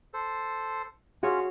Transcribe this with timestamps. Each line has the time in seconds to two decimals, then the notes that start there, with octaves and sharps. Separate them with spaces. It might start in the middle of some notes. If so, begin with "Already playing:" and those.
0.14 A4 C5
1.23 C#4 F4 F#4 G#4 C#5